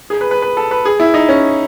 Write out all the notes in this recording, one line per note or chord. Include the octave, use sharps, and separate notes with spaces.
G#4
B4
B4
B4
A4
B4
G#4
E4
D#4
C#4